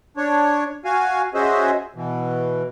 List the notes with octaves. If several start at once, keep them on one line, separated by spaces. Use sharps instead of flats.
D4 C#5
F#4 F5 G#5
C#4 F#4 G#4 C5 D#5 E5
B2 E3